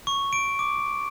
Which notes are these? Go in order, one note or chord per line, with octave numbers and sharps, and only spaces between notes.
C#6
D7
D6